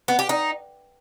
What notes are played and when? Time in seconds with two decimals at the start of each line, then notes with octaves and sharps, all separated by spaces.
0.08 B3
0.19 G4
0.29 D#4